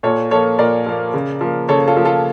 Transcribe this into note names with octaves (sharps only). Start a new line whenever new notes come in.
A#2 A4 C#5
F3 A#3 A4 C#5
A#2 A#4 D5
F3 A#3
C#3
F3 A#3
C#3 A4 C#5
F4 A4
F3 A#3
F4 A4